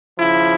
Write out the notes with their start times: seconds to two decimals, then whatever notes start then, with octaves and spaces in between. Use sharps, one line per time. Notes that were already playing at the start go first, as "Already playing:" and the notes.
0.18 C#3 F3 E4